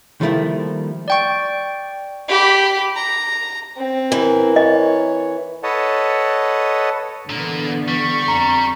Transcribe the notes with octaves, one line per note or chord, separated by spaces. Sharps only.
D#3 F3 G3 A3 A#3 E4
D5 G5 C#6
G4 B5
A#5
C4
E3 A#4
C#5 D#5
A4 B4 C#5 D#5 F#5 A5
A#2 D3 E3 A#3 B3
G3 C#6
F2 A#5